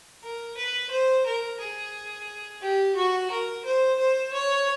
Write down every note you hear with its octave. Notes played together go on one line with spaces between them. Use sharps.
A#4
B4
C5
A#4
G#4
G4
F#4
A#4
C5
C5
C#5